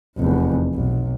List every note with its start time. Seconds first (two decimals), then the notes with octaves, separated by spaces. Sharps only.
0.18 F1 E2
0.74 B1